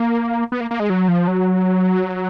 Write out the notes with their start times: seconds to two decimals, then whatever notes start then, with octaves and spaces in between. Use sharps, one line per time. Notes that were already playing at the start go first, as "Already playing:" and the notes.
Already playing: A#3
0.52 B3
0.61 A#3
0.71 A#3
0.80 G#3
0.90 F#3
1.08 F3
1.28 F#3